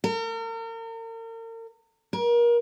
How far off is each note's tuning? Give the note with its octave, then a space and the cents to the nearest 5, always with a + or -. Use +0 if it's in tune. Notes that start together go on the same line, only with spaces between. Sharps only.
A#4 -40
A#4 +30